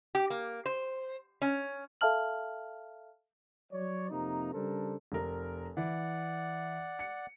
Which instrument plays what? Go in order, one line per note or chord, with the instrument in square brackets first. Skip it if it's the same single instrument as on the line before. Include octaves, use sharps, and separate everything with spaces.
[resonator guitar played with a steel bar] G4
A#3
C5
C#4
[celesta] A4 E5 F5 A5 F6 F#7
[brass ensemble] F#3 C#5 D5
F2 C3 A#3 D#4 A#5
C#3 G3 D4 A4 A#4 C5
[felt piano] F1 A#4
[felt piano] E3 [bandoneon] D5 F#5
[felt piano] C#7